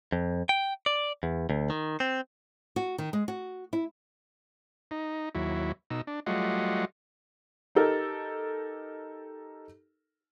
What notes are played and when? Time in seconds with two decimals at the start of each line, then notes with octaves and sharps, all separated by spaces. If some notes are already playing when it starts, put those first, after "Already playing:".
0.12 F2
0.49 G5
0.86 D5
1.23 E2
1.49 D2
1.70 D#3
2.00 C4
2.76 F#4
2.98 D#3
3.13 G#3
3.28 F#4
3.73 E4
4.91 D#4
5.35 D#2 F#3 E4
5.91 B2 D#4 E6
6.07 D4
6.26 F#3 G3 A3 F4 D#5 F#5
7.75 D#4 G4 A4 A#4